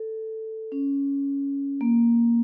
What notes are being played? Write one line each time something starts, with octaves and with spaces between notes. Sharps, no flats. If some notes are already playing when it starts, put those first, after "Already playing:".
Already playing: A4
C#4
A#3